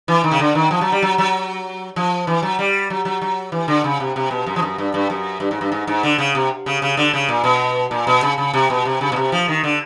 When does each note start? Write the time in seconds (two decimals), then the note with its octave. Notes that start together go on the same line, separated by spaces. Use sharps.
0.08 E3
0.24 D#3
0.32 C#3
0.40 D3
0.55 D#3
0.71 F3
0.81 F#3
0.92 G3
1.02 F#3
1.18 F#3
1.96 F3
2.27 E3
2.43 F#3
2.59 G3
2.90 F#3
3.05 F#3
3.22 F#3
3.52 E3
3.68 D3
3.84 C#3
4.00 C3
4.16 C3
4.31 B2
4.46 F#2
4.56 F3
4.62 F#2
4.78 G2
4.94 G2
5.10 F#2
5.40 G2
5.51 G#2
5.61 G2
5.72 G#2
5.87 G#2
6.03 D3
6.18 C#3
6.35 C3
6.66 C#3
6.82 C#3
6.97 D3
7.14 C#3
7.29 A#2
7.44 B2
7.91 A#2
8.07 B2
8.23 C#3
8.38 C#3
8.54 C3
8.70 B2
8.85 C3
9.01 C#3
9.12 B2
9.16 C3
9.32 F3
9.48 D#3
9.63 D3